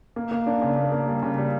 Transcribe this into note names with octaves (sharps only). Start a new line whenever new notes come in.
A#3
A#3
D4
C#3
A#3
A#3
G3
C#3
G3